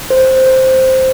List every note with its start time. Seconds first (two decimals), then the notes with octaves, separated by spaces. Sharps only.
0.10 C5
0.46 C5